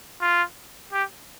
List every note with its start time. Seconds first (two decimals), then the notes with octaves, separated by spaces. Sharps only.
0.21 F4
0.93 G4